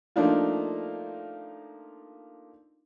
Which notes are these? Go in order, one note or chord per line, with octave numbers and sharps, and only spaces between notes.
F3 A3 A#3 D4 D#4 F4